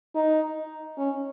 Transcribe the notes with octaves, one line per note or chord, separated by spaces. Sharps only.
D#4
C#4